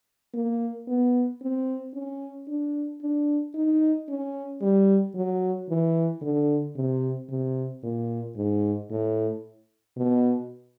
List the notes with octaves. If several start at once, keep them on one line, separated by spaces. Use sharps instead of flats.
A#3
B3
C4
C#4
D4
D4
D#4
C#4
G3
F#3
E3
D3
C3
C3
A#2
G#2
A2
B2